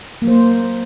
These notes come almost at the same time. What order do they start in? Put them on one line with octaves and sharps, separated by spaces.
A#3 F#3 C5